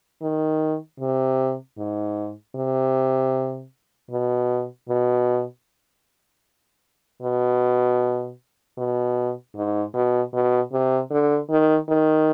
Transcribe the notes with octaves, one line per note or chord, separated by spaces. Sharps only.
D#3
C3
G#2
C3
B2
B2
B2
B2
G#2
B2
B2
C3
D3
D#3
D#3